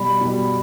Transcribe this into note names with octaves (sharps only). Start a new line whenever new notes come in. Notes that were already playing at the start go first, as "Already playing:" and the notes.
Already playing: B2 G3 B5
B2 G3